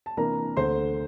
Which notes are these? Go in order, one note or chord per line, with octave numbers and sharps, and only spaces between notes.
A5
C3 E3 A#3 D4 A#4 A#5
D2 D3 A3 C5 C6